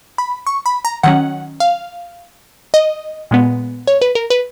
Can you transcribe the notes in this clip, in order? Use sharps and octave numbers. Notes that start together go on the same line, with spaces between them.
B5
C#6
B5
A#5
D#3 F#3 C#4 F#5
F5
D#5
A#2 G#3 B3
C#5
B4
A#4
B4